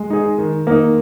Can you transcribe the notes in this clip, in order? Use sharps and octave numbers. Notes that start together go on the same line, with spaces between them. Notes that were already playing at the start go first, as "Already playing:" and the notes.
Already playing: G#3
D#4 G#4
D#3
A#3 D#4